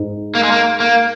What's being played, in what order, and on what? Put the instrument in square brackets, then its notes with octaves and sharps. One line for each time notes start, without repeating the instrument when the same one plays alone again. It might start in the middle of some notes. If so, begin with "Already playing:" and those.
Already playing: [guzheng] G#2
[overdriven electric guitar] A#3
G#3
A#3
A#3